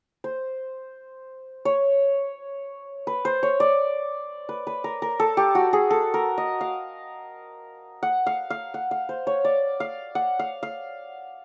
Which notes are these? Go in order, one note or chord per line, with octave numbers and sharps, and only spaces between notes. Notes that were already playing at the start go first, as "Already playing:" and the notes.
C5
C#5
B4
C5
C#5
D5
B4
B4
A#4
A#4
A4
G4
F#4
G#4
A4
A#4
D#5
F5
F#5
F5
F5
F#5
F5
C5
C#5
D5
F5
F#5
F5
F5